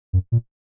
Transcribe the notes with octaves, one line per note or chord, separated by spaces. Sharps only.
F#2
A#2